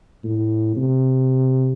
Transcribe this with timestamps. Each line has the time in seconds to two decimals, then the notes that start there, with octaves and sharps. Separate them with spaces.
0.24 A2
0.77 C3